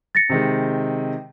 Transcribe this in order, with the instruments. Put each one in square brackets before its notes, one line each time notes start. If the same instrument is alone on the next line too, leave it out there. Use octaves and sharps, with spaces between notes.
[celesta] A6 A#6 C#7
[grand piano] C3 D#3 G#3